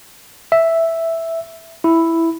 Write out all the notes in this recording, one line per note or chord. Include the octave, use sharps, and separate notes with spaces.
E5
E4